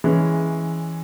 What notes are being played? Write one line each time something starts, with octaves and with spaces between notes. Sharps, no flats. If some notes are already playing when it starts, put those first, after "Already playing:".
E3 G#3 C#4